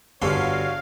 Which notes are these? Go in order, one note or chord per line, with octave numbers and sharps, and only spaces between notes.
G1 G2 F#4 A4 C#5 F5 C6